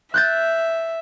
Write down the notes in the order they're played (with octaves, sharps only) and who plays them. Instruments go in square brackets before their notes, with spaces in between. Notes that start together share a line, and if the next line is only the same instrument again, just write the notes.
[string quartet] E5 [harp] F#6 G6 A6